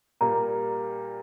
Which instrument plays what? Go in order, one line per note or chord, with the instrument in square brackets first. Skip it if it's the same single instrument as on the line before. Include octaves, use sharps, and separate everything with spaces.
[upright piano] A#2 G3 A#3 [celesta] A#5